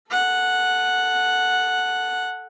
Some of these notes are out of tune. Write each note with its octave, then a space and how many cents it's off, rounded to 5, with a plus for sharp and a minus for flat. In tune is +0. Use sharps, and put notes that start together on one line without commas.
A4 +5 F#5 -5